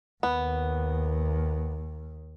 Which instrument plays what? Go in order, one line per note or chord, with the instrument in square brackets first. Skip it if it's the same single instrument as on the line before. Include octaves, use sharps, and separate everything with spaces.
[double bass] D#2 [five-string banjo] B3